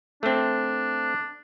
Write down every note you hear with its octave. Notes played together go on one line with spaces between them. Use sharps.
A3 C4 D4